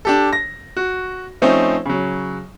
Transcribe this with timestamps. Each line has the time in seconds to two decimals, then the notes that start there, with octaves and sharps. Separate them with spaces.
0.05 D4 G4 A4
0.33 A#6
0.77 F#4
1.42 F3 A3 C4 C#4 D#4
1.86 C#3 F#3